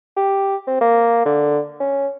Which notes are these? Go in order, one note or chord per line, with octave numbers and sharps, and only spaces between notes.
G4
C4
A#3
D3
C#4